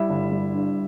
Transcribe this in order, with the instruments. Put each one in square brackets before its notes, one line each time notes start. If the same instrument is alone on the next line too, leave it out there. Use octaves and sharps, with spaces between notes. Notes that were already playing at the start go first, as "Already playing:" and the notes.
Already playing: [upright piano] G3 E4 E5
G1
G3
G2